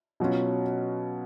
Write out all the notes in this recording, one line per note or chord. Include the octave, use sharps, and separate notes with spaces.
B2 F#3 C#4 F4